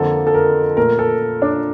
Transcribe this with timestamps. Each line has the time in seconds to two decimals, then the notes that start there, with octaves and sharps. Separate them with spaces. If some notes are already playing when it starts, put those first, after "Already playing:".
Already playing: F2 D3 F3 A#3 A4
0.27 A4
0.34 A#4
0.77 A#2 A3 A#4
0.99 A4
1.42 D4